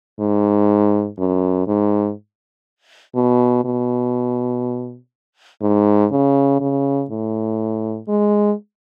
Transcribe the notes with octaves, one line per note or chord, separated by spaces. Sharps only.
G#2
F#2
G#2
B2
B2
G#2
C#3
C#3
A2
G#3